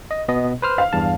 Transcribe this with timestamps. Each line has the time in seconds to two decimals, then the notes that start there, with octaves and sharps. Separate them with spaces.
0.11 D#5
0.28 B2 B3 D#5
0.62 B4 C5 F6
0.78 F5
0.93 E2 G2 A5